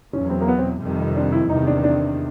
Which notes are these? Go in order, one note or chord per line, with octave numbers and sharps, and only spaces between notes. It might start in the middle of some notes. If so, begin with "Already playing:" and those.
E2 B2 F#3 C#4
C4
A#3
B3
C4
F2 C3 D#3 G3
D4
E4
E2 C3 D#3 D#4
D4
D4